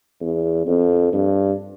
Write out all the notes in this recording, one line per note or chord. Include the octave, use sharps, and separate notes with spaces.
E2
F2
G2